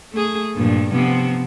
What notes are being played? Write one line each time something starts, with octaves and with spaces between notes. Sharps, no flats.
A3 G#4
G2 A#2 F3
C3 F3 B3